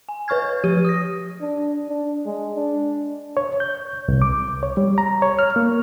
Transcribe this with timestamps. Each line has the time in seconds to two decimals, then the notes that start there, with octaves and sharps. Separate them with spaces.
0.09 G#5
0.28 B4 C#5 C#6 F6 G#6
0.64 F3 G4 D#7
0.85 D#6 A#6
1.41 D4
1.89 D4
2.26 G#3
2.56 D4
3.37 C#5
3.60 G6
4.08 C2
4.22 D6
4.63 C#5
4.77 G3
4.98 A#5
5.22 C#5
5.39 F6
5.56 A#3